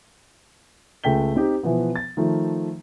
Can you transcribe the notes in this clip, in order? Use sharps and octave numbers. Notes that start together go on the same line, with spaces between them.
C#2 A3 G5 B6 G7
C4 D#4 G4
B2 E3 F3 B3
A6
D#3 F3 A3